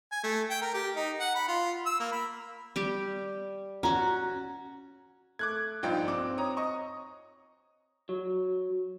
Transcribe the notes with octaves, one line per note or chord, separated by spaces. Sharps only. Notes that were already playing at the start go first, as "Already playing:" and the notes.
G#5
A3
G5
A#4
G4
D#4
F#5
B5
F4
E6
A#3
B5
G3 G4
C#4 F#4 A#5
A3 D6 F#6 G#6
A#1 G2 D#4 F4 G5
C4 D6
C#5 A#5 D#6
D#5 C#6 D#6
F#3